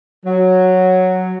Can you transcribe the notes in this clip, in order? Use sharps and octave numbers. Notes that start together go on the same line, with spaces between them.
F#3